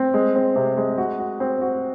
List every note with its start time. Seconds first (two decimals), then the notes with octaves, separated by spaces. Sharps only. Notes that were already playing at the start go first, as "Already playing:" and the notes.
Already playing: C4
0.14 G#3
0.35 C4
0.56 C3
0.77 G#3
0.98 F#4
1.19 F#4
1.40 C4
1.61 F#4